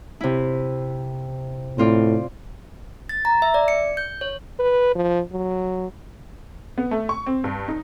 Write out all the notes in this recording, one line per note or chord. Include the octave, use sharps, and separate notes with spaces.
C3 E4
A2 C4 F4 D5
A6
A#5
E5
D5
C#7
G6
C#5
B4
F3
F#3
B3
A3
C#6
C4
G2
D#4